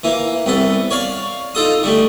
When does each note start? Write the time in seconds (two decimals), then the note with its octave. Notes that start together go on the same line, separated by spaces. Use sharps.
0.04 E3 A#3
0.46 C2 B3 A4
0.91 C#5 D5 F5
1.55 D#4 F4 A4 D#6
1.83 D3 G3 A3